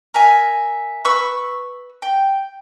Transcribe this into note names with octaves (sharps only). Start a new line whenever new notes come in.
A#4 E5 G#5
B4 C#6 E6
G5